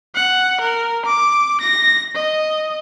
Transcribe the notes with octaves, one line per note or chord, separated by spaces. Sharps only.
F#5
A#4
D6
A#6
D#5